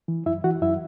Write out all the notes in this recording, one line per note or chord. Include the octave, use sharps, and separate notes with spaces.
E3
F#2 E4 E5
E3 F#4 F#5
F#2 E4 E5